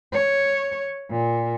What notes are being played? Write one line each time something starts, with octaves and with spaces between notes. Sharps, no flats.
C#5
A#2